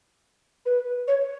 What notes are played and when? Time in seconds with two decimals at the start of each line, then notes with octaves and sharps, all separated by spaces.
0.66 B4
1.08 C#5